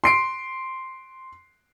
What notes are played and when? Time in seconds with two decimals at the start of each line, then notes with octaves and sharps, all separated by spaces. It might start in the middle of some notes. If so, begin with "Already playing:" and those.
0.04 C6 C7 D7